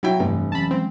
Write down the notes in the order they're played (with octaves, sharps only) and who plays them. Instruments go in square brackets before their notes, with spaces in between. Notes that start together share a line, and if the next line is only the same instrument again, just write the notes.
[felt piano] F#3 E4 G5
[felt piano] F1 [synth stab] G2 [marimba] E3 A3
[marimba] E3 F#3 C#4 [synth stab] A5 B5
[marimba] F3 G#3 [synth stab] C4